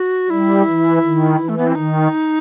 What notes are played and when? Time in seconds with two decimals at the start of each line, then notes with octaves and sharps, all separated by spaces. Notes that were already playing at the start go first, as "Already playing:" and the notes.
Already playing: F#4
0.30 G3 E4
0.66 E3
1.03 D#3
1.40 E3
1.49 A3
1.58 B3
1.67 C4
1.75 D#3 D#4